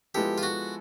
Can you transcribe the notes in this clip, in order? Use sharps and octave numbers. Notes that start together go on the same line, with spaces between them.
F3 G#3 B3 E4 G4 A4
F4
F#4